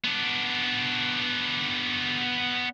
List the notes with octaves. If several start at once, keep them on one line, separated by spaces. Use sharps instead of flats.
B3 D4